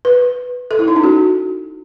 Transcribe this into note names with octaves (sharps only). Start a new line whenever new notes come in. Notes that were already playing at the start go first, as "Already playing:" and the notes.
B4
A4
E4
D#4
C#4
F#4